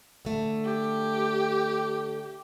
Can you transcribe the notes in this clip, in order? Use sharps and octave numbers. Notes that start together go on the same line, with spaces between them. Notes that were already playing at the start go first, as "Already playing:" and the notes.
D3 A3
G4